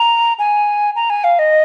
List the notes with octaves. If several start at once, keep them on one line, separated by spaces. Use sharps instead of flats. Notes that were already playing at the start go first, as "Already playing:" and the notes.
Already playing: A#5
G#5
A#5
G#5
F5
D#5